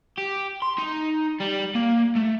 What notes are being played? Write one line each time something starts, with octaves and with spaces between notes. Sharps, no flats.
G4
C6
D#4
G3
A#3
A3